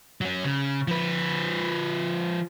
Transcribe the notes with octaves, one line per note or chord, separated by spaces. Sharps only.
F#3 C#4
C#3
F3 B4